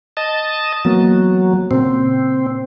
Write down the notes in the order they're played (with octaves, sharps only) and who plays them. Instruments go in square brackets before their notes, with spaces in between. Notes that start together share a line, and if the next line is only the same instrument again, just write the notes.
[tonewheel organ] D#5 A5
[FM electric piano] E3 A#3 B3 [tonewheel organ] F#3
[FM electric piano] A#2 C#3 A#3 [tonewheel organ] C4